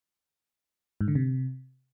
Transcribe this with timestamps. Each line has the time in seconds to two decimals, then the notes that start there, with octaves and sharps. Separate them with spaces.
1.01 G#2
1.08 D3
1.15 C3